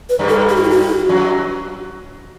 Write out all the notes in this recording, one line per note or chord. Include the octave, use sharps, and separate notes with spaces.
B4
G2 G3
A4
G4
F#4
E4
F#4
F#2 F#3